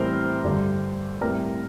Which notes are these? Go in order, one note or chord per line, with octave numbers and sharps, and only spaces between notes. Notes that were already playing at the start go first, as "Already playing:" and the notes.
Already playing: A2 E3 G3 C4 A#4 C5
G2 D3 G3
A2 G3 C4 A#4